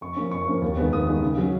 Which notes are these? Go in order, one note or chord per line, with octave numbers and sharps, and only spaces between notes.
F2 C#6
F3 A#3 C#4
F2 C#6
F3 A#3 C#4
D#2
D#3 G#3 B3
D#2 D#6
D#3 G#3 B3
C#3
F#3 C#4